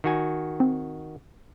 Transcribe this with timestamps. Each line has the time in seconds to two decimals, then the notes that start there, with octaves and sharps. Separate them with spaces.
0.04 D#3 F#4 G#5
0.60 C4